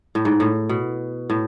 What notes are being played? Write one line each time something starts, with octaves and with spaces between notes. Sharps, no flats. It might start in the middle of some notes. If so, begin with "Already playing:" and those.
A2
G#2
A2
B2
A2